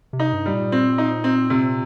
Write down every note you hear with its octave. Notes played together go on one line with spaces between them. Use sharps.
C3
D#4
G2
G3
A#2
C4
D#4
C4
C3